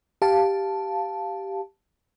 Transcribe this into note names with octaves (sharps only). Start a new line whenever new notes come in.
G4 F5 A5